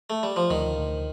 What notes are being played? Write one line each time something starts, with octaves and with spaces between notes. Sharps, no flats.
A3
G3
F3
D2 D#3
D2